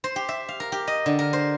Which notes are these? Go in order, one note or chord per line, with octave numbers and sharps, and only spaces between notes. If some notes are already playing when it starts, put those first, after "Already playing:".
C5
G4
E5
F5
A#4
G4
D#5
D3
A#4
C5